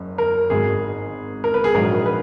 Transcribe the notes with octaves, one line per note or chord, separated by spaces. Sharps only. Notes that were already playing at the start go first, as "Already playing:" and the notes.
Already playing: F#1 F#2
A#4
G#1 G#2 F#3 G#4
A#4
B4
G#4
A#1 G#2 F#3 A#4
B4